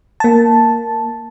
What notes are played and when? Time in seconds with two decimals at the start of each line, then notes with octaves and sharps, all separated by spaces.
0.20 A#3 A5